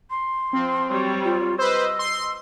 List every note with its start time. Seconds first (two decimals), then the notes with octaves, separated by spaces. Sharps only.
0.10 C6
0.53 F3 C4
0.88 F#3 G3 C#5
1.25 F4
1.59 B4 C5 D#5 E6
1.99 C6